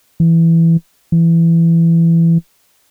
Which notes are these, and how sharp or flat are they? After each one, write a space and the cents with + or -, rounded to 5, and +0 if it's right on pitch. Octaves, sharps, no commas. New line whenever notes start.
E3 +5
E3 +15